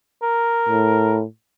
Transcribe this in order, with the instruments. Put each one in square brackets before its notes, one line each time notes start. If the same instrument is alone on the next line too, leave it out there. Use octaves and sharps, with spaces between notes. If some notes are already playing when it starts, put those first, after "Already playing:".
[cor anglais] A#4
[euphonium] A2